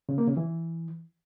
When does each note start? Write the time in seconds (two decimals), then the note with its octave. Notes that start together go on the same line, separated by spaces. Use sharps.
0.09 C#3
0.18 A#3
0.27 C#3
0.37 E3